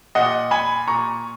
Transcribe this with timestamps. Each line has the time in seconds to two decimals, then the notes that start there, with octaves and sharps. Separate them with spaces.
0.15 A#2 D#5 F#5
0.51 G#5 B5
0.87 A#2 A#5 C#6